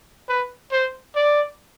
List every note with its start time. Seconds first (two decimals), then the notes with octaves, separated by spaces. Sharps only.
0.29 B4
0.72 C5
1.15 D5